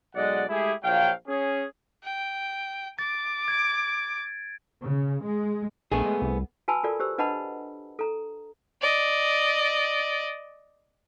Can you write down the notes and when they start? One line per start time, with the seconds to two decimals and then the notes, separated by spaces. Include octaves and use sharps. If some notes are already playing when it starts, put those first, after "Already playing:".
0.15 B1 G#3 D5 D#5 F#5
0.49 G#3 A3 E4 G4 G#4
0.83 A#1 F3 F#3 F5 G5
1.27 C#4 G#4
2.03 G5
2.99 D6 A6
3.48 G#6 D7
4.83 C#3
5.25 G#3
5.92 A#1 A3 B3 G#4
6.06 G#3
6.22 C2
6.68 F#4 B4 G#5 A5 B5 E6
6.83 F4 F#4 A4 A#4 D5
7.00 G4 C5 E6
7.18 D4 B4 D#5 F#5 A5 B5
7.99 A4 A#5
8.81 D5 D#5